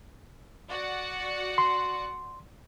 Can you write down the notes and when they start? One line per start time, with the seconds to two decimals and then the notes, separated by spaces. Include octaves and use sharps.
0.68 F#4 D5 F#5
1.58 C6